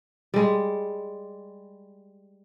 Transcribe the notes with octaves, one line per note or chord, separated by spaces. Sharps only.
G3 G#3